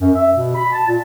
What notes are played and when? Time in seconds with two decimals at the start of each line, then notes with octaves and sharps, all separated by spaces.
0.01 F#2
0.15 E5
0.35 B2
0.54 B5
0.72 A5
0.88 A#2